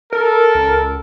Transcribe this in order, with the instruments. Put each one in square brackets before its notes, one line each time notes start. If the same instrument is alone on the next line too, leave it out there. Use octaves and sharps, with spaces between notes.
[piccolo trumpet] A4 [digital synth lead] A#4
[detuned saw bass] C#2